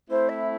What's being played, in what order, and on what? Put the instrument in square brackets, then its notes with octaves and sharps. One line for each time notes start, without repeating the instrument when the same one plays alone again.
[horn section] A3 C4 E4 [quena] C5
[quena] E5